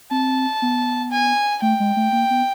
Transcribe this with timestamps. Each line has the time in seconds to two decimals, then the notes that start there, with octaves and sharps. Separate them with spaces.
0.11 C4 A5
0.62 B3
1.11 G#5
1.62 A3 G5
1.80 G#3
1.96 A3
2.12 A#3
2.30 B3